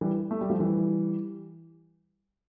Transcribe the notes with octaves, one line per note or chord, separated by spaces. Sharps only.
E3 G3
A3
G3
F3 A3
E3 G3